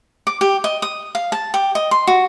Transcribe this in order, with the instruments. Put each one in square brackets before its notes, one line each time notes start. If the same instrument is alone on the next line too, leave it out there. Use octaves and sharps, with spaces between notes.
[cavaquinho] D6
G4
D#5
D#6
F5
A5
G4
D#5
C6
F#4